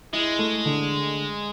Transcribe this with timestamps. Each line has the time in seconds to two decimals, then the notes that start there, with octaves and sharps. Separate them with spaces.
0.13 G#3 E4
0.39 A3
0.65 D3